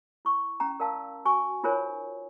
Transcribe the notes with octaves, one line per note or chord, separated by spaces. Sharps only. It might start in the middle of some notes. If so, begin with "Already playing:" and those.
E4 C#6
C#4 G5 A#5
A#4 D5 F5 A5 E6
F#4 G#5 C#6
D#4 F4 A#4 C5 C#5 G#5